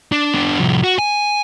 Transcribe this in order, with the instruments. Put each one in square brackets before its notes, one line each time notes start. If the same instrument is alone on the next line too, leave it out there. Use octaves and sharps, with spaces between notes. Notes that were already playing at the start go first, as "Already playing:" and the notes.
[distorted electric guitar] D4
B3 D4
C2 F3
F#4
G#5